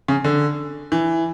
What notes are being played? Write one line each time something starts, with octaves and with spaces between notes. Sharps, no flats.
C#3
D3
E3